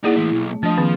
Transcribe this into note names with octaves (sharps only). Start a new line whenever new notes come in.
A#3 D#4 E4 G#4 D5 F#5
E3 A3
B1
A3
F3 D4 D#5 A5 D#6
D#3 A#3 C4 G#4